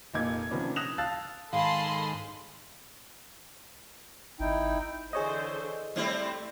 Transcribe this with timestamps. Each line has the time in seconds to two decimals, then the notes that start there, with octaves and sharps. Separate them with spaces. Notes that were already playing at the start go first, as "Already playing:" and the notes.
0.14 F1 A#2 A#3 D#4 D6 G#6
0.51 C3 D#3 F3 B3 C#4 D4
0.76 D#6 F#6 A#6 E7 F7
0.98 F5 A5 E6 F#6 A6
1.53 G#2 D#3 G#4 A4 F5 A5 B5 C6
4.40 G#1 D#4 E4 G5
5.13 D3 E3 G#4 C5 C#5 D#5
5.96 G3 A3 C4 E4